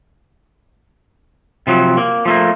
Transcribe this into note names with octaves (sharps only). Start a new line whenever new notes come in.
C3 F3 F#3
A#3
F3 A3 A#3